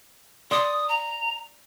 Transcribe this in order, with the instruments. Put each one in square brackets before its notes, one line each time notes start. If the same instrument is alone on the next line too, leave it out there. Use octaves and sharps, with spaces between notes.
[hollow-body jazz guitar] D5 C6 [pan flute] D#6
[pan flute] A#5